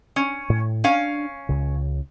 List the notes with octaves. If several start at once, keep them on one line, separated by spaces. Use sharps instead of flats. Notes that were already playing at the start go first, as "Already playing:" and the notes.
C#4
A2
C#4 D4 F5
C#2 C#3